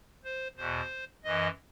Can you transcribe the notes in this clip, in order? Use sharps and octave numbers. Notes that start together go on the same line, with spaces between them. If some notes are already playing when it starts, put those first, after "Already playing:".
C5
E2 B2 C5
F#2 E3 D#5